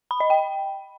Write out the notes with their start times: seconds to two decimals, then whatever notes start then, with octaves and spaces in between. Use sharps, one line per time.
0.11 B5
0.20 D#5
0.30 G5